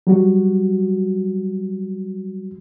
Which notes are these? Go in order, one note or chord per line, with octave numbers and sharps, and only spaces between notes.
F#3 G3 F#4